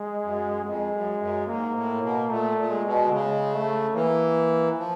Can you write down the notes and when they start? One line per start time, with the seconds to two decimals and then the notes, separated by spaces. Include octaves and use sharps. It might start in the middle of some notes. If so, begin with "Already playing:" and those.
Already playing: G#3
0.23 F#2
0.64 F2 G#3
0.92 F#2
1.20 F#2
1.47 G#2 A#3
1.75 A2
2.02 B2
2.30 A#2 A3
2.58 A#2
2.71 G#3
2.85 B2
3.07 D3
3.12 C#3 G#3
3.54 A3
3.95 E3 A#3
4.78 F3